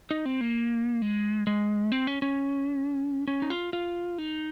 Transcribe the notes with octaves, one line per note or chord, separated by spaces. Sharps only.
D#4
C4
A#3
G#3
G#3
C4
C#4
C#4
C#4
D#4
F4
F4
D#4